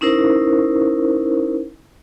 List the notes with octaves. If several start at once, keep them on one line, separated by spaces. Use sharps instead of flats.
C#4 D#4 E4 A#4 C5